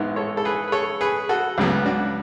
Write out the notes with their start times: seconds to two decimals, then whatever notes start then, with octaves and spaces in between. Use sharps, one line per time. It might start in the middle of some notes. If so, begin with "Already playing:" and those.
Already playing: A1 G#2 G#3 B3
0.16 A4 C#5
0.37 A4
0.45 G#4 B4
0.68 B4
0.72 A4 C#5
1.01 G#4 B4
1.29 F#4 A4
1.58 C#2 C#3 F#3 B3
1.85 D4 F#4